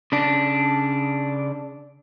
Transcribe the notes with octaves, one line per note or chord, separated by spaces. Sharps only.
C#3 D4